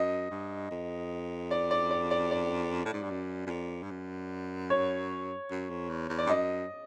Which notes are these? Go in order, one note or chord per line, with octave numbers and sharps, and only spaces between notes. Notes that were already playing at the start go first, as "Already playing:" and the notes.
Already playing: F#2 D#5
G2
F2
D5
D5
D5
D5
D5
A2
G#2
G2
F#2
F#2
F2
G2
F#2
C#5
F#2
F2
E2
E2
D5
G2
F#2 D#5